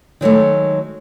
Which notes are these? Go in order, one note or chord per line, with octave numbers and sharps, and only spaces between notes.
D#3 F#3 G#3 A3